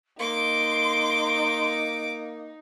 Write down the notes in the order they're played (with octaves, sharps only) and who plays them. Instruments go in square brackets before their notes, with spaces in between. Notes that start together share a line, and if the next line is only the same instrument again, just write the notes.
[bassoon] A#3 [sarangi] D#4 [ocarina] C6 [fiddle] D6